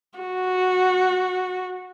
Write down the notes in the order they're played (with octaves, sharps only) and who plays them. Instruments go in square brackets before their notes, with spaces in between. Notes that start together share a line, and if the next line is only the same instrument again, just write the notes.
[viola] F#4